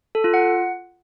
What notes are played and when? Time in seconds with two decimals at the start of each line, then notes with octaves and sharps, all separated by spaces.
0.15 A4
0.24 F4
0.34 F#5